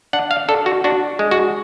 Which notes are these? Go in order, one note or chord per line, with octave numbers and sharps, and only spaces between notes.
D4 F#5
F5
D4 A4
F#4
D4 F#4
G#3
F#4